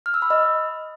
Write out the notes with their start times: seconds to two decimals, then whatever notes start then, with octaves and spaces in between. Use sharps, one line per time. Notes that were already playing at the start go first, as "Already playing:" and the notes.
0.06 F6
0.14 E6
0.22 B5
0.30 D#5